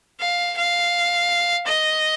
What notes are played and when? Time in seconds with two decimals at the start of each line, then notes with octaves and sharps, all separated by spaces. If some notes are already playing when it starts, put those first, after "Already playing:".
0.20 F5
0.57 F5
1.67 D#5